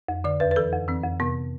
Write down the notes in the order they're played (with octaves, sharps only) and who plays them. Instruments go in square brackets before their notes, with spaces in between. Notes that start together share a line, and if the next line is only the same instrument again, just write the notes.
[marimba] F2
D3 D5
E2 B4
B4
E3 A4
F2
E3 C4
F2
C3 B3